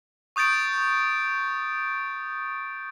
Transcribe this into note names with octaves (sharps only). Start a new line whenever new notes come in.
C#6 D#6 G6 A6 D7